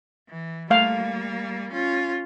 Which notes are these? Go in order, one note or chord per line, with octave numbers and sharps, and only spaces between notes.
E3
G3 A3 A#3 F5
C#4 F4